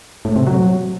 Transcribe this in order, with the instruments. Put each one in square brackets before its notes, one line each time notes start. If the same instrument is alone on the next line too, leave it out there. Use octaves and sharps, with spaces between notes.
[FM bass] A2
C3
F#3